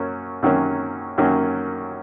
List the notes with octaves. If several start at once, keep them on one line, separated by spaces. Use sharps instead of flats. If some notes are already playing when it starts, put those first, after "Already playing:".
Already playing: F#2 F#3 A#3 C#4
F#2 D#3 F#3 A#3 C#4
F#2 D#3 F#3 A#3 C#4